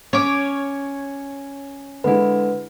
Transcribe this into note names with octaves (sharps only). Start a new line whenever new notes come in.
C#4 C#5 D6
D3 G#3 E4 B4